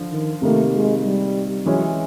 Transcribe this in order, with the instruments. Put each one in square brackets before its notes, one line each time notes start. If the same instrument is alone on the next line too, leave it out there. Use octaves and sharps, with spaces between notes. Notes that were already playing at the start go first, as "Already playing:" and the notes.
Already playing: [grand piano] D3 F3
[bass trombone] D#3
[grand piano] C3 D#3 G3 A#3 [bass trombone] A3
[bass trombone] G#3
G3
[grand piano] E3 G#3 C#4 E4 [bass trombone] F#3